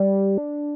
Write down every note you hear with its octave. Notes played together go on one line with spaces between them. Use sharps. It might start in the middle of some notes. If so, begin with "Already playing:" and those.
Already playing: G3
D4